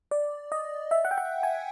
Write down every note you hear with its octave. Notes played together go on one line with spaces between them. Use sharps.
D5
D#5
E5
F#5
G5
F#5
G#5